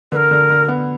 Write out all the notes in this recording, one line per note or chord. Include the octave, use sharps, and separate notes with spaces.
D3 A#4 B4
D3
D3
B3